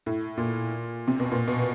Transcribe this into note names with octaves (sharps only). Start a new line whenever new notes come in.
A2
A#2
C3
B2
A#2
B2